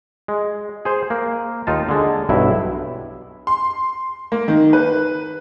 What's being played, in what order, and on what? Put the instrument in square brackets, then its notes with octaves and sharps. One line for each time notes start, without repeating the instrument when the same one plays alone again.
[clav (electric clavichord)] G#3
G#4 C5
A#3
D#2 D#4 F4 A5
D3 G#3
B1 G2 E4 E5
[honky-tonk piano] C6
A#3
D#3
B4